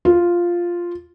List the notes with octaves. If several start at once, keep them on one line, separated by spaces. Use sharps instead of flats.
F4